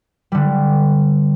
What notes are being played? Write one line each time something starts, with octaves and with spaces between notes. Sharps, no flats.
D3 G3